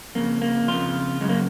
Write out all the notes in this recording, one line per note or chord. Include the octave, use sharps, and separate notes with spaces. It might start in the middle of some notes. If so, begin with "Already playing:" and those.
F2 C#3 A#3
A#3
F2 C#3 F4
F#2 C#3 G#3
A#3